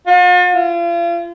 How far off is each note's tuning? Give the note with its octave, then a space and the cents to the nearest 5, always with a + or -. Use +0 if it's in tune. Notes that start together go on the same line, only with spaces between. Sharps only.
F4 +45
F4 -35